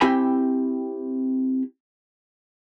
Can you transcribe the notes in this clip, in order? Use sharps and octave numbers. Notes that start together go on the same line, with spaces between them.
C4 E4 G4 G5 G#5 B5